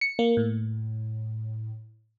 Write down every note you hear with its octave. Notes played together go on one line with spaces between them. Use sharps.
C#7
A#3
A2